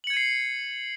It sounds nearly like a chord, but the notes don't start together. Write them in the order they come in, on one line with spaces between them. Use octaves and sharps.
F#7 C#7 G#6 D#7 C7